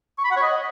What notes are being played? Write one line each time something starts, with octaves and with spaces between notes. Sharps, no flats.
C#6
B5
F#5
C#5
D#5